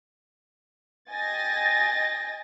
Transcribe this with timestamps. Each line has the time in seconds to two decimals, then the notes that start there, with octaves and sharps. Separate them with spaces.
1.11 D#5 G5 G#5 A6 A#6